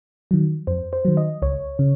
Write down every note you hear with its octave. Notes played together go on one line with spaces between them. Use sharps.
D#3 F#3
F2 C5
C5
D#3 F#3
D#5
C#2 C#5
C#3